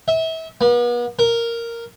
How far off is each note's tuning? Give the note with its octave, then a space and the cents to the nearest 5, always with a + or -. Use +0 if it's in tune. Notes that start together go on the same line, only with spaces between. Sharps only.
E5 -30
B3 -40
A#4 -5